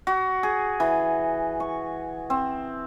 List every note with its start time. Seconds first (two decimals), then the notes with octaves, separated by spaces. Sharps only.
0.07 F#4
0.43 G#4
0.80 E3
1.60 C#6
2.30 C4